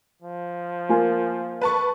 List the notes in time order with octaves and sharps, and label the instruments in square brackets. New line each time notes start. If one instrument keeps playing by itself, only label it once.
[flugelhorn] F3
[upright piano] A#3 F4 G#5
[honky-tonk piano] B4 A5 C#6